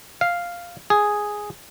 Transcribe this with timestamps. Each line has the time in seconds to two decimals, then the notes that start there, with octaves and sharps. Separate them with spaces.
0.21 F5
0.90 G#4